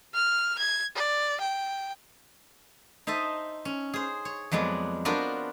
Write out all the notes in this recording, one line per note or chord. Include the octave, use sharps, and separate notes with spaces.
F6
G#6
D5
G5
D#4 C5 D#5 E5 A5
C#4
G#4 C5
C#5
F2 F#3 G#3 B3 D5
B3 D4 F4 F#4 A#4 C5